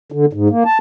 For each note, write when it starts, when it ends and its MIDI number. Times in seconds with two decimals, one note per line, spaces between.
0.12 0.26 50
0.33 0.48 44
0.50 0.63 58
0.65 0.78 81